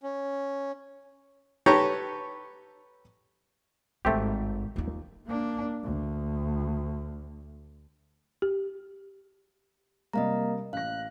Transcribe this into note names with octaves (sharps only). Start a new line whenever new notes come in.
C#4
G4 A4 B4 C#5 A#5 C#6
G#1 G2 A3 C4 G4
D#2 F4
A#3 D4
D2
G4
C3 G3 A#3 D#5 F5 A#5
A1 F5 F#6 A#6